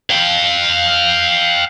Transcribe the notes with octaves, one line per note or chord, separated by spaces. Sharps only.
F5 G5